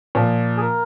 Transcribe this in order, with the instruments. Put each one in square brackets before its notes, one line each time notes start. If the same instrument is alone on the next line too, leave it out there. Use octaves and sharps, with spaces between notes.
[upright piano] A#2 F3
[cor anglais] G#4
A#4